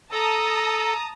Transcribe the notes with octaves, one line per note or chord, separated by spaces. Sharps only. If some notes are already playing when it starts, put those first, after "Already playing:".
A4 A5 A#5 D#6